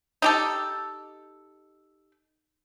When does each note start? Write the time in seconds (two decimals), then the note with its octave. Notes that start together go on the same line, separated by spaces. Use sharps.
0.22 D#4 G4 A4